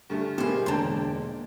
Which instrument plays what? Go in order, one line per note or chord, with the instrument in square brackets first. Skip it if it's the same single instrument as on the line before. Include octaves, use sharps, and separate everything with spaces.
[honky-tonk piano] D2 G2 A3
[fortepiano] B2 G#3 A#3 [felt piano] G4 [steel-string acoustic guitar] G#4 C5
[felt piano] E1 [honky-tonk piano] D3 [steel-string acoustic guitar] A#3 D#4 [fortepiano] G5 A5 C6